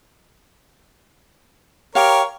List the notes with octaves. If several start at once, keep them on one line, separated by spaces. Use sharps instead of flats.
G4 A#4 C#5 F5